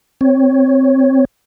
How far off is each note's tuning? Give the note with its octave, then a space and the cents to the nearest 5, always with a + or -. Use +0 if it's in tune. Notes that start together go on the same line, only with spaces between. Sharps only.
C4 +0 C#5 +0